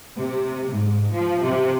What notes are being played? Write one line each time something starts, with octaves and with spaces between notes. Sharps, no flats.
C3
G#2
F3
C3